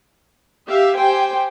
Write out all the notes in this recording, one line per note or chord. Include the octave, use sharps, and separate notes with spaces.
G4 E5 F5
G4 C5 G5 G#5